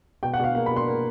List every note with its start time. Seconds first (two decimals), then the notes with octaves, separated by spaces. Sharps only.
0.23 B2 G5
0.34 F#5
0.40 B2 F5
0.55 A#3 F5
0.66 B5
0.71 B2
0.77 C6
0.87 A#3